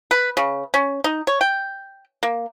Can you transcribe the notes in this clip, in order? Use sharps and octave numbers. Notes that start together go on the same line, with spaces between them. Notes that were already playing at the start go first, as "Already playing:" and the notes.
B4
C#3
C#4
D#4
C#5
G5
A#3